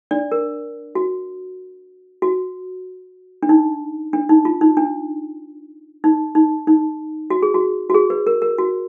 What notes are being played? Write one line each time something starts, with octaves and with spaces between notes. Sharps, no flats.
D4 D5
A#4
F#4
F#4
D4
D#4
D4
D#4
F4
D#4
D4
D#4
D#4
D#4
F#4
G#4
F#4
F#4
G#4
B4
A#4
A#4
F#4